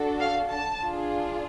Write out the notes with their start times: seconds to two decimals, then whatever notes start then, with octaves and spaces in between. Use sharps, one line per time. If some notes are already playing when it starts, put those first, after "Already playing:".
Already playing: D4 F#4 A4
0.20 F5
0.50 A5
0.80 D4 F4 G#4